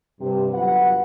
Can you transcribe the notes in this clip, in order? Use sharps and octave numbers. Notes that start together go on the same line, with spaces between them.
G2 C3
G1 F#3 F4 B4 F#5